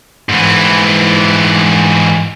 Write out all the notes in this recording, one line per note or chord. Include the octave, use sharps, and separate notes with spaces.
G#2 E3